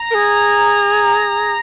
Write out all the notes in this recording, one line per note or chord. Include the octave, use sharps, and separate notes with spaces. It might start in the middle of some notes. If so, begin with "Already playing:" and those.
Already playing: A#5
A#4
G#4